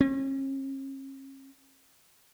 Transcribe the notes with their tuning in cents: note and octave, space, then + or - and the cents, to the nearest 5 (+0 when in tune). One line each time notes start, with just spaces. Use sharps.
C#4 -40